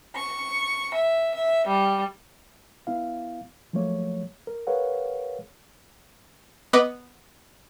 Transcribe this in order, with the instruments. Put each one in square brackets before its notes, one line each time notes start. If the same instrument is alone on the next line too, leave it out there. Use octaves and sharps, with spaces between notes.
[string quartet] C#6
E5
E5
G3
[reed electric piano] B3 E4 F5
F3 F#3 A3 A#3 C#5
A#4
G#4 A#4 B4 C#5 F5 F#5
[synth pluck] B3 B4 D#5 D6 C#7